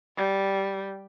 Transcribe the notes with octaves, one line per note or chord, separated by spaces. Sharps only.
G3